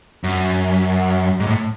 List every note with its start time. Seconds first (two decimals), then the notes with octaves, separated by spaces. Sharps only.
0.24 F#2
1.40 G#2
1.47 A2